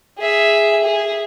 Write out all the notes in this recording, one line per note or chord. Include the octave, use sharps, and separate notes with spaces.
G#4 E5
G#4